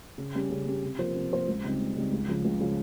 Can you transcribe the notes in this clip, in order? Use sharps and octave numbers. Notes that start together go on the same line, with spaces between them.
C#3
G3 C#4 G4
C#3
G3 C#4 G4
C3
F3 A#3 F4 C5
C3
F3 A#3 F4 C5
C#2
C#3 G3 C4 D#4
C#2
C#3 G3 C4 D#4
C#2
C#3 F3
C#2
C#3 F3